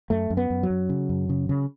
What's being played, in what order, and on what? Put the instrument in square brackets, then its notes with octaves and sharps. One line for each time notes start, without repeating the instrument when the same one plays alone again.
[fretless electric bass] F#2 A3
F#2
B3
F#2
F#3
F#2
C#3
F#2
C#3
C#3